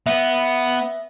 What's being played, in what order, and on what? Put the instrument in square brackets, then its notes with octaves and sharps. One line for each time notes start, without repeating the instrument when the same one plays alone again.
[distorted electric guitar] B3 [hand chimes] E5